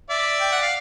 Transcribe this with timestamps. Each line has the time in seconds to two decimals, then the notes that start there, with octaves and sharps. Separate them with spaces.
0.10 D5 E5
0.41 G5
0.52 F#5
0.62 F5